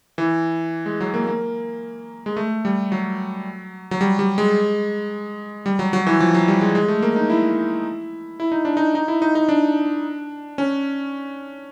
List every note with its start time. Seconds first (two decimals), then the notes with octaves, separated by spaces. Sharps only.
0.18 E3
0.86 G#3
1.01 F#3
1.14 A#3
1.27 A#3
2.26 G#3
2.37 A3
2.65 G3
2.92 F#3
3.91 F#3
4.01 G3
4.19 G3
4.38 G#3
5.66 G3
5.79 F#3
5.93 F#3
6.07 E3
6.20 F3
6.34 F#3
6.48 G3
6.61 G#3
6.75 G#3
6.88 A3
7.02 A#3
7.16 D#4
7.30 E4
8.40 E4
8.52 D#4
8.65 D4
8.77 D#4
8.95 D#4
9.08 E4
9.22 D#4
9.35 D#4
9.49 D4
10.58 C#4